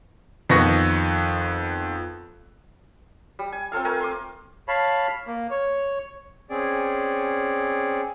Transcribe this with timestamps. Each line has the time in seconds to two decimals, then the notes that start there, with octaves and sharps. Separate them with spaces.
0.49 F2 D#3 B3 C#6 A#6
3.39 G3
3.52 G#5
3.72 C4 F4 A4 F5
3.85 A3 A#4 G#5
4.00 C6 D6
4.68 C#5 F5 A5 B5
5.27 A#3
5.51 C#5
6.49 C4 C#4 G#4 D5